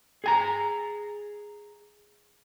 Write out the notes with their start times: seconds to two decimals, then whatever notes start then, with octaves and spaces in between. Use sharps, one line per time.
0.24 G#4 G#5 A#5